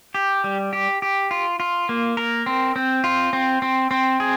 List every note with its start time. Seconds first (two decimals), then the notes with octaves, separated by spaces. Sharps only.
0.14 G4
0.44 G3
0.73 G4
1.02 G4
1.31 F4
1.60 F4
1.89 A#3
2.17 A#4
2.46 C4
2.76 C4
3.04 F4
3.33 C4
3.62 C4
3.91 C4
4.20 G#4